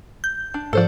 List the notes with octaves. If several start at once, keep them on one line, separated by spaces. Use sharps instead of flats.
G6
D4
G#2 F3 A4 C5 D5